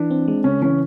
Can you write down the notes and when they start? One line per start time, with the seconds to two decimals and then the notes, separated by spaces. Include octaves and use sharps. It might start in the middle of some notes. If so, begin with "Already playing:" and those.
Already playing: E3 D4
0.11 C4
0.28 G#3
0.44 C#3 C#4
0.62 E3 C#4